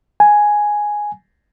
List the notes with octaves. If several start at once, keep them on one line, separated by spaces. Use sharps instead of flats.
G#5